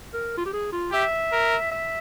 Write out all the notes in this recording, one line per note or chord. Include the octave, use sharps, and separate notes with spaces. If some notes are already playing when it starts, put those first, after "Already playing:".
A#4
F4
G4
G#4
F4
G4 E5
A#4
E5